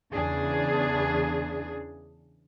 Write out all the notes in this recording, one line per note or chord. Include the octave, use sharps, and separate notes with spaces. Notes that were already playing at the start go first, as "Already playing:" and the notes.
E2 C#3 D4 G#4